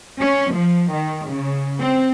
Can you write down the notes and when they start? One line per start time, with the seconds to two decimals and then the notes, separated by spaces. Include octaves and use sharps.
0.19 C#4
0.52 F3
0.93 D#3
1.27 C#3
1.81 C4